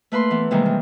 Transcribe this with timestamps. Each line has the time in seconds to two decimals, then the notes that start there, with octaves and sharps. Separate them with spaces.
0.12 A3 A#3 B4 B5 C6
0.30 E3 B3
0.51 C3 D#3 E3 G3 G#3 A#3
0.66 A#3